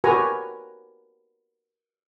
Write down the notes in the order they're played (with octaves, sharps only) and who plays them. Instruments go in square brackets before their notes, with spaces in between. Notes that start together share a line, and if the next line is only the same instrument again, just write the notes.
[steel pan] F#4 G4 A#4 B4 G#5 A#5